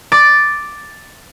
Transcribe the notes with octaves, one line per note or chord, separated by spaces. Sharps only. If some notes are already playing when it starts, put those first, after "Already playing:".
D6 A6